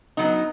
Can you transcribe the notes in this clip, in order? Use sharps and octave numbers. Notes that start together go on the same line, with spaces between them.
F#3 B3 D#4